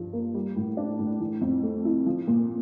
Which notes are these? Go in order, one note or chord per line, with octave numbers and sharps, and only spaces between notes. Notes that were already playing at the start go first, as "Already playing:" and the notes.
Already playing: G2 F3
A#3
G3
A2
D4
A2
E3
F2
A3
E4
F3
A#2